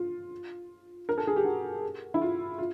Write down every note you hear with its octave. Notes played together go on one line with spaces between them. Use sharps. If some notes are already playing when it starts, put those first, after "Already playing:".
Already playing: F4
A#4
A4
G#4
G4
F#4
E4
F4
F4